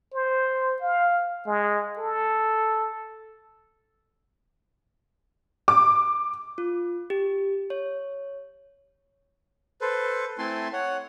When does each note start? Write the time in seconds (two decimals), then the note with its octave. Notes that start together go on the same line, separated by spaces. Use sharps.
0.14 C5
0.81 F5
1.46 G#3
1.98 A4
5.68 D6
6.58 F4
7.10 G4
7.70 C#5
9.81 A4 B4 C5
10.38 A3 C4 E4 G#5 A5 C6
10.73 C#5 F#5